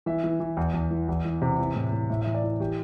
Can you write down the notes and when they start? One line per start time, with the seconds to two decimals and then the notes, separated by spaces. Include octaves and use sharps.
0.06 E3 E5
0.24 E3
0.40 E3
0.57 E2
0.74 E2
0.91 E3
1.09 E2
1.25 E3
1.42 C3
1.59 E3
1.75 A2
1.92 A2
2.10 A2 E5
2.22 E3 E5
2.35 D5
2.44 E3
2.60 E3 G4